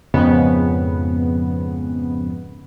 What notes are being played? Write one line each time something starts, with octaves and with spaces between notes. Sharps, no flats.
F2 G#2 C#3 B3